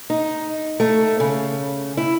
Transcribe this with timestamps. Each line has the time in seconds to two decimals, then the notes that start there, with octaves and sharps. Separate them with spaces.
0.10 D#4
0.80 A3
1.20 C#3
1.97 E4